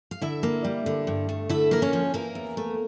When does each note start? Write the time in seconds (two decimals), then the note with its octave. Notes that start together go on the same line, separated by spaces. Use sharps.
0.11 F5
0.21 D3 E4 E5
0.43 A#3
0.64 G3
0.86 D3
1.07 G2
1.29 A3
1.49 D3 E4 E5
1.71 A#3 A#4
1.82 C#4 C#5
1.93 F3
2.14 E3 A#3 A#4
2.35 E2
2.57 A3